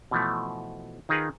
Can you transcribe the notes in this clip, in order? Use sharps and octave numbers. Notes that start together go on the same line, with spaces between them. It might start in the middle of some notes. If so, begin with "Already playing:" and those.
B2 E3 F3 A3
D#3 D#4 F4 G#4 A#4 B4